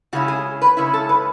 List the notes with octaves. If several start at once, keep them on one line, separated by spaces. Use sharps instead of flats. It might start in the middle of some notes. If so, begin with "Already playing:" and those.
C#3 G#3 C#4 E4 F#4
G#4
B4
C#3 G#3 C#4 E4
A4
B4